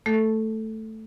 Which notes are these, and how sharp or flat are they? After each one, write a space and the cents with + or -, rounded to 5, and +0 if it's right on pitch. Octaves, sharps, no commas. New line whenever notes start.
A3 +0 A4 +0